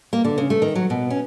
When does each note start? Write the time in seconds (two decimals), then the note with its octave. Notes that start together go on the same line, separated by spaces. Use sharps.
0.13 A#3
0.24 D3
0.38 C#3
0.50 A3
0.62 D#3
0.75 F#3
0.90 B2
1.10 C#4